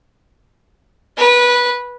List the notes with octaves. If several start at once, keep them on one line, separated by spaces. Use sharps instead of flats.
B4